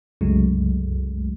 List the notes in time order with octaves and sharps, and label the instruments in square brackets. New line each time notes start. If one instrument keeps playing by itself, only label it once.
[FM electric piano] C2 F#2 C#3 F#3 G#3 A3